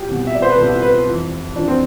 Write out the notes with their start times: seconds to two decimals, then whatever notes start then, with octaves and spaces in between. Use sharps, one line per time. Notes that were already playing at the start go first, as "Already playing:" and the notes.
Already playing: G4
0.08 C2 B2
0.27 E5
0.35 D5
0.42 C5
0.50 B4
0.57 C2 B2 A4
0.82 B4
1.06 F2 E3
1.55 F2 E3 D4
1.68 C4